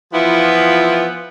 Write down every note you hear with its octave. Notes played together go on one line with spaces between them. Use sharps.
E3 F3 B3 E4 F4